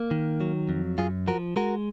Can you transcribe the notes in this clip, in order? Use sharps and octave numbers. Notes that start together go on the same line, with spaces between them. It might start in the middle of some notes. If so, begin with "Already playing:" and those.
Already playing: A#3
D#3
F#3
F2
F#2 F4 G#4
F3 F#4 A#4
G#3 F#4 A#4